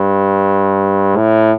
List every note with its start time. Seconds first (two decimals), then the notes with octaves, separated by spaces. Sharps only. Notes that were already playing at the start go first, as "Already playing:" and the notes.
Already playing: G2
1.16 A2